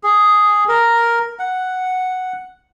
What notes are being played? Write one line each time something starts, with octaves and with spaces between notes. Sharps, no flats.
G#4
A#4
F#5